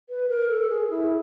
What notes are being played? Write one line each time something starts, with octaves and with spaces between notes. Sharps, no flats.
B4
A#4
A4
G#4
E4